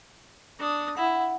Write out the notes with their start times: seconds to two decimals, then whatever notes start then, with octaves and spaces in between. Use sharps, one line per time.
0.60 D4 D#6
0.97 E4 F#5